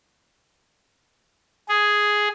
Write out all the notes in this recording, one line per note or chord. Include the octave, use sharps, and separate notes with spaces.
G#4